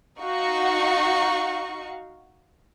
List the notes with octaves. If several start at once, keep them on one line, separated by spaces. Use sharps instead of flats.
D#4 F#4 F5 C#6